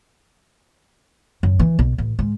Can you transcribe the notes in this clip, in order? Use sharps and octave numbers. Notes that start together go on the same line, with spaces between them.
F#2
E3
B1
A1
G#2